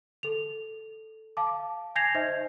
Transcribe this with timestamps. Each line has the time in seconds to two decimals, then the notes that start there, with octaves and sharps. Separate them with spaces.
0.23 A4 F7
1.37 F5 A5 D6
1.95 G#5 G6 G#6 A#6 C7 F7
2.15 D#4 C5 D#5 E5